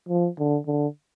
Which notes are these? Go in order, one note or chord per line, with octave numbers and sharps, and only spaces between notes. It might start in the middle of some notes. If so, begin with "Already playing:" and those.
F3
D3
D3